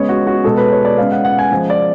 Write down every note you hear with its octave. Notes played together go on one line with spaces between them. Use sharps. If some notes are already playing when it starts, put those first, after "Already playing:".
Already playing: C#3 G#3 B3 C#5
F#4
F#4
B2 G#3 B3 A4
B4
C#5
D5
C#3 G#3 B3 F5
F#5
F#5
G#5
C#3 F3 G#3
D5